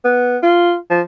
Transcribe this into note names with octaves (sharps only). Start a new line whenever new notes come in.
B3
F4
F3